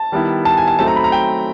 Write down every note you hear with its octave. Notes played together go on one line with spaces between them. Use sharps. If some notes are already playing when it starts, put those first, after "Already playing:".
Already playing: A5
D#3 G3 B3 E4
A5
G#5
A5
F#3 A3 C4 D#4 A5
A#5
B5
A#5
G5